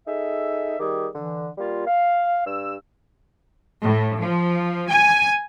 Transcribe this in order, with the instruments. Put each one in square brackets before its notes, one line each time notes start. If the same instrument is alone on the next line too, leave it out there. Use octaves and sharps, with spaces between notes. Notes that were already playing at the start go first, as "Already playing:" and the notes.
[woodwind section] D#4 G#4 A4 E5
D#3 G3 G4 G#4
D3 E3
G3 A#3 F4
F5
G2 E6
[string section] A2
F3
G#5